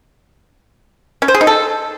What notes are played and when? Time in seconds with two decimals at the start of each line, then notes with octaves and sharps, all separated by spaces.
1.22 C#4
1.28 C5
1.35 G#4
1.41 D#4
1.47 A4